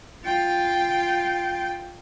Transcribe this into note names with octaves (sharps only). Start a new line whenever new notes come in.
F4 G5